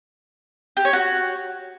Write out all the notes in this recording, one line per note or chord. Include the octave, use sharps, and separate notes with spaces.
G4
C#5
F#4